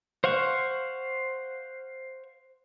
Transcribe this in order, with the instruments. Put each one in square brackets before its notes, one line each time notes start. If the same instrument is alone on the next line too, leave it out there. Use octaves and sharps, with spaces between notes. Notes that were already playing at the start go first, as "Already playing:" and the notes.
[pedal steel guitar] C5 F5 F#5 C#6